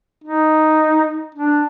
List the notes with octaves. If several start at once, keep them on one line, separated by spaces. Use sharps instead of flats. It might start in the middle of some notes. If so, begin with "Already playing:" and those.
D#4
D4